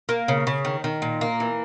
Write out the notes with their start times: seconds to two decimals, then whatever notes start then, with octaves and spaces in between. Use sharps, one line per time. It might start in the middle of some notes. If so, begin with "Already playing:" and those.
0.09 A#3
0.28 C#3
0.47 C#3
0.65 D#3
0.84 D#3
1.02 A#2
1.21 A#3
1.40 E3